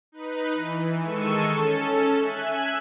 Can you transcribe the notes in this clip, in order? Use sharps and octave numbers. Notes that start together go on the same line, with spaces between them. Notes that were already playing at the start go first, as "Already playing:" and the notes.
D#4 B4
E3
D#3 G#3 A4 C#6 E6 D#7
C#4 A4
E5 G#5 F#6